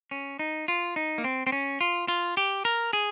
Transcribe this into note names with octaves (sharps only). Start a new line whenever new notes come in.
C#4
D#4
F4
D#4
A#3
C4
C4
C#4
F4
F4
G4
A#4
G#4